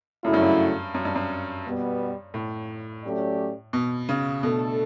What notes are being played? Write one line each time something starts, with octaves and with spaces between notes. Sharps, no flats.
F#2 C#3 F#3 A3 E4
G2
F#2
F#2
G2
F#2
B2 G3 B3
A2
F#3 A3 C#4 G4 D5
B2
C#3
B2 A3 D4 A4